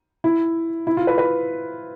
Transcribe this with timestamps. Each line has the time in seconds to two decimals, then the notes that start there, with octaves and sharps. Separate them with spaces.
0.24 E4
0.87 E4
0.97 F4
1.07 B4
1.18 B4